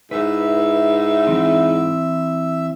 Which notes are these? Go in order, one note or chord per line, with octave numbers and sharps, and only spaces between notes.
G#2 E4 B4 E5
E3 C4